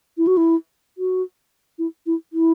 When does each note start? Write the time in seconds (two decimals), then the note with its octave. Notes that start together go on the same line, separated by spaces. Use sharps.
0.17 E4
0.27 F#4
0.37 E4
0.98 F#4
1.78 E4
2.06 E4
2.33 E4